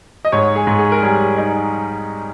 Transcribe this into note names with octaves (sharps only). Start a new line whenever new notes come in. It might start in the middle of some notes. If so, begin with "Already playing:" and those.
D#5
G#2 C#5
G#4
G#2
G#4
A#4
G3 G#4
D#4